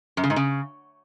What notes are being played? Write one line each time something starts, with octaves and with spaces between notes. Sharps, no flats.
F#2
C#3
G#2
C#3